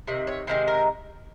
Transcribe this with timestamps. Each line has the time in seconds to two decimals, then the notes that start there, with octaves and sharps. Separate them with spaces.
0.07 C3 D#3 D#5
0.27 C#5
0.47 C3 D#3 G#3 C5
0.68 A#4